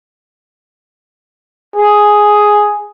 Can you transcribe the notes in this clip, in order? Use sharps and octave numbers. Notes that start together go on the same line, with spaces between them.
G#4